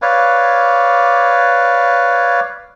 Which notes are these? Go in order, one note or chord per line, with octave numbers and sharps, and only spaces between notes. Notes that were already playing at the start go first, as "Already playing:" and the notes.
B4 C#5 D5 F5